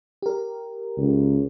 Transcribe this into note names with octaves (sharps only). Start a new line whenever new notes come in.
G4 A#4
C#2